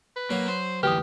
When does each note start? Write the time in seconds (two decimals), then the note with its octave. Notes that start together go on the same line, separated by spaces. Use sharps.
0.16 B4
0.30 F#3 A#3
0.48 C5
0.83 D2 E3 G4 B4 D#6